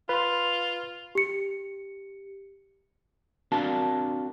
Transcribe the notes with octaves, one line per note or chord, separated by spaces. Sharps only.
F4 B4 C6
G4 C#7
C4 D4 F#4 A#4 F5 A5